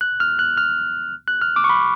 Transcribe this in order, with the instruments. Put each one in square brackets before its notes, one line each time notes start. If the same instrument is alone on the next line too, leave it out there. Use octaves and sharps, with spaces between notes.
[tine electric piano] F#6
F6
F#6
F6
F#6
F6
D6
C#6
B5